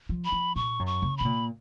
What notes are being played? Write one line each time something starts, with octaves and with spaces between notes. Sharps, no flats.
F3
B5
F3
A#2 C#6
F#2
C#6
C#3
B2 B5
A#2